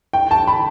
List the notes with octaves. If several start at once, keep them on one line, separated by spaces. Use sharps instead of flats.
G5
A5
B5